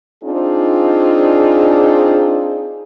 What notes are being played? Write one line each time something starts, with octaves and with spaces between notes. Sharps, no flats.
C4 D4 D#4 F4 G#4